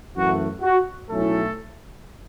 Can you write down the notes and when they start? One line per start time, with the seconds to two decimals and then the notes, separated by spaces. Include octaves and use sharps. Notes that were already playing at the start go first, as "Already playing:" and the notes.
0.14 F#2 E3 A3 F#4
0.62 F#4
1.09 B1 A2 F#3 A3 C#4 E4 A4